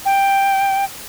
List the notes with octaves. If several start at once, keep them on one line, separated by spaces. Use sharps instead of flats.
G5